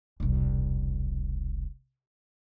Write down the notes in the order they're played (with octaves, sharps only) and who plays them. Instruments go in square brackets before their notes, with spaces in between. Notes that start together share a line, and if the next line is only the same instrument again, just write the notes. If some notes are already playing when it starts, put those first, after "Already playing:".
[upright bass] E1 C2